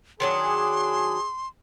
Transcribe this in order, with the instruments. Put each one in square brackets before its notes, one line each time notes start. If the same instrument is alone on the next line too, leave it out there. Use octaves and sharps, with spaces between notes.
[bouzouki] D#3 F#3 D4 [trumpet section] G#4 [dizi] C6